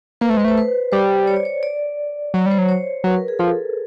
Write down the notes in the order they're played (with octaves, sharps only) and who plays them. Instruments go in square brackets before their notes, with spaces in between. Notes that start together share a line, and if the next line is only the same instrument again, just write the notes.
[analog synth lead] A#3 [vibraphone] B4
[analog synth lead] A3 [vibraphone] C5
[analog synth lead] G#3 [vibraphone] B4
[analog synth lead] A3 [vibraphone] C5
[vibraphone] B4
[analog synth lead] G3 [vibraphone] C5
[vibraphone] C#5
D5
C#5
D5
[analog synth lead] F#3 [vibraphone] C#5
[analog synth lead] G3
[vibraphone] C5
[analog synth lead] F#3
[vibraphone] C#5
[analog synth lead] F#3 [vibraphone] B4
[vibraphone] A#4
G#4
[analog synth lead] F3 [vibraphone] A4